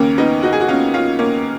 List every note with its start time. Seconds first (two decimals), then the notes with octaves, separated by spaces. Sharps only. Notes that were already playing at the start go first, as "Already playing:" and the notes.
Already playing: D#2 C#3 A#3 C#4
0.18 B3 D#4
0.43 D#4 F#4
0.53 G#4
0.61 F#4
0.68 C#4 F4
0.94 C#4 F4
1.19 A#3 C#4